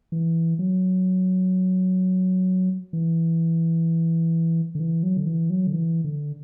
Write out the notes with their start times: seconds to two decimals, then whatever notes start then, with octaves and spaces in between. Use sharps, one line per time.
0.12 E3
0.59 F#3
2.93 E3
4.75 D3
4.80 E3
5.03 F#3
5.17 D3
5.26 E3
5.50 F#3
5.67 D3
5.73 E3
6.04 D3